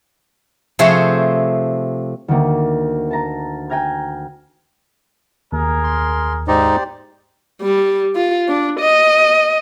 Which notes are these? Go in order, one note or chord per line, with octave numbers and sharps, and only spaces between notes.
C3 F3 A3 G#4 C5 C#5
D2 D#3 A#3
A5 A#5
G5 G#5 A#5 F6 G#6
D#2 G#4 A#4
C6
G#2 D#4 G4 C5 D5
G3
F4
D4
D#5